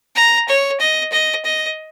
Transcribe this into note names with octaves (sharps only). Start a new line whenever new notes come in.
A#5
C#5
D#5
D#5
D#5